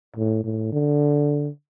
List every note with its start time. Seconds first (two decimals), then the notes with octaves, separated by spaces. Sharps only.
0.16 A2
0.44 A2
0.73 D3